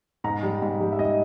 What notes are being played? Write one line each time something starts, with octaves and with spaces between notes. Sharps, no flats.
G#2 A#5
G3
G#2
G3
E5
G#2 D#5